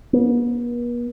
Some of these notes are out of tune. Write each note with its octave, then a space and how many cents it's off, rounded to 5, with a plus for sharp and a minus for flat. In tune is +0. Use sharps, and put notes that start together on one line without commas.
B3 -45